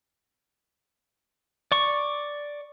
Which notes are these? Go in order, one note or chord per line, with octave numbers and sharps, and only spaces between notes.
D5 C#6